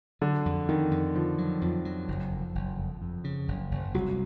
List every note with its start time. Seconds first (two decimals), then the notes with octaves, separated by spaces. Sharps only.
0.21 D3 F#3
0.46 F2
0.69 F2 D#3
0.91 F2
1.15 D3 F3
1.38 F#3
1.61 F2 F3
1.85 F#3
2.08 F#1
2.31 F2
2.55 F#1
2.78 F2
3.02 F2
3.24 C#3
3.48 F#1
3.71 F#1
3.94 C2 F#3